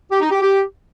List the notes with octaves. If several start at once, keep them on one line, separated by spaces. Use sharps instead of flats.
G4
D#4
G4
G4